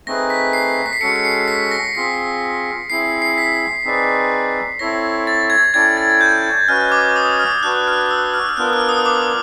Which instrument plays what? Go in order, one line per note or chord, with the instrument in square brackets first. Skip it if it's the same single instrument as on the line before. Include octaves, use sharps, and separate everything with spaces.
[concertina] A3 C4 D#4 G#4 B4 [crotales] A#6
[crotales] B6
C7
B6
C7
[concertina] G#3 C#4 F#4 A4 [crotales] C#7
[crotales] C#7
C7
B6
A#6
[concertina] C4 F4 G#4 [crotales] B6
[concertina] C4 E4 G#4 [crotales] C7
[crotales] C7
B6
[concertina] C4 D#4 G#4 B4 D5
[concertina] C4 E4 A4 C#5 [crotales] A#6
[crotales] A6
G#6
[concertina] C#4 E4 A4 D5 G5 [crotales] G#6
[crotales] A6
G6
[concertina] C#4 F#4 B4 D#5 G#5 [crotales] F6
[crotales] D6
D#6
F6
[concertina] D4 F#4 B4 [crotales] F#6
[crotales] F6
E6
F6
F6
[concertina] B3 D4 F4 A#4 [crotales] F#6
[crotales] F6
D#6
D6